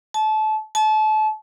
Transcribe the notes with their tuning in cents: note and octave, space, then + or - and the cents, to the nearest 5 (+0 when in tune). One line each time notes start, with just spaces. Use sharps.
A5 -25
A5 -30